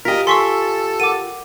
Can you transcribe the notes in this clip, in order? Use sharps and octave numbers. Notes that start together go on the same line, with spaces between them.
F4 G4 A#4 D#5 B6
A4 G#5 C6 C#6 E6 B6 C7
A#4 F#5 D6 D#7